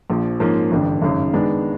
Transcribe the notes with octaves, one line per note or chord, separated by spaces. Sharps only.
A#1 A#2 F3
G#2 F3 A#3 C#4
A1 G2 D3
G#1 F#2 C#3
D#3 G#3 B3 D4